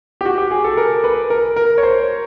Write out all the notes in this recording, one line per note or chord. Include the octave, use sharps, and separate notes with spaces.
G4
F#4
G4
G#4
A4
A#4
B4
A#4
A#4
C#5
C5